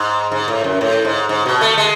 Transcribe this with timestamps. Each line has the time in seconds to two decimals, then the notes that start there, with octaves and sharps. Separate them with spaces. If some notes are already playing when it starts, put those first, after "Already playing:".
Already playing: G#2
0.32 G#2
0.48 A2
0.64 F#2
0.81 A2
1.05 G#2
1.29 G#2
1.46 B2
1.61 A3
1.78 G#3